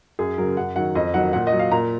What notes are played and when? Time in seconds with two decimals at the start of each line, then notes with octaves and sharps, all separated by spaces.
0.19 F#2 G#4
0.38 C#3 F#3 A#4
0.57 F#2 F#5
0.76 D#3 F#3 F#5
0.95 F2 D#5
1.14 D#3 F#3 F#5
1.33 A#2 F#5
1.47 D#5
1.52 F#3
1.59 F5
1.71 A#2 A#5